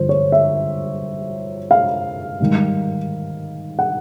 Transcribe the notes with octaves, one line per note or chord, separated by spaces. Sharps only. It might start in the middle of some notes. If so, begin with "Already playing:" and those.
Already playing: G2 D3 F3 C5
C#5
E5
F5
G#2 D#3 G3
F#5